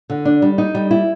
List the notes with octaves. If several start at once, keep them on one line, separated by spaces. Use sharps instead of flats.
D3
D4
G3
D#4
G3
E4